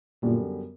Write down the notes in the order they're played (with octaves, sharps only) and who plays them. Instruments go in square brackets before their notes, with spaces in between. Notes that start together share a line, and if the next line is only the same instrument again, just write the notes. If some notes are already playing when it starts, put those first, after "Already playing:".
[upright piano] F#2 D3 G3 B3 [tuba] A#2